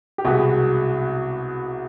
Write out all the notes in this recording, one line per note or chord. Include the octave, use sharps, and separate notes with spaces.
G4
C2 B2 G#3 B3 F#4